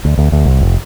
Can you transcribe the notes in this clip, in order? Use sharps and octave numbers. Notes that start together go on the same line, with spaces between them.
D2
D2
D2
C2
F1